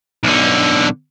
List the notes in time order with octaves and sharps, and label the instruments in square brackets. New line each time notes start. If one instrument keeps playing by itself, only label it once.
[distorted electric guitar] B1 D3